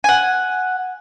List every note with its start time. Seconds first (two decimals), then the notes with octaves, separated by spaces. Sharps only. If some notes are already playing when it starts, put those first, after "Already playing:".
0.04 F#5 G#5